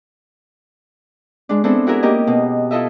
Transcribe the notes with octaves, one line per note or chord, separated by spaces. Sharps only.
G#3 D4
B3 C4 D4 E4 A4 C5
E4 F#4 G#4 A#4 E5
A#3 C#4 G4 A#4 D#5
B2
E4 F4 A4 D#5 E5